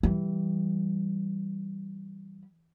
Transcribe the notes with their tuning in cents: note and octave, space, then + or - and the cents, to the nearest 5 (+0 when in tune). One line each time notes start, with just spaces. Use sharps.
E3 +0 G3 -10